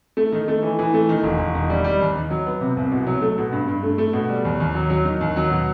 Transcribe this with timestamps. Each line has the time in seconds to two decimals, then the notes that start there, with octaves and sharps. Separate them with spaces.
0.17 A3
0.32 D#3
0.48 A3
0.63 E3
0.79 E3
0.94 A3
1.09 D#3
1.23 E1
1.39 E1
1.55 D#3
1.70 G3
1.84 G3
2.01 D#2
2.15 D#3
2.30 F#3
2.46 B3
2.61 C3
2.76 C2
2.92 B2
3.07 F#3
3.22 A3
3.38 B2
3.52 G2
3.68 G2
3.83 A3
3.98 A3
4.13 B2
4.29 G3
4.45 D#2
4.60 D#2
4.75 F#3
4.90 F#3
5.05 D#3
5.21 D#2
5.36 F#3
5.50 B2